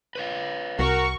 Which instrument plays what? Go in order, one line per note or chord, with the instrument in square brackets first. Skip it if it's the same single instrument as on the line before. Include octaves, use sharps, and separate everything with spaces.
[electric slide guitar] B4 C#5 F5
[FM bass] C2 [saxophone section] F#4 A#4 [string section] C#6